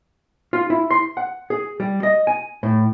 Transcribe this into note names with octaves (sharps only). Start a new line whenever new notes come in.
F4
E4
C6
F#5
G#4
G3
D#5
G#5
A2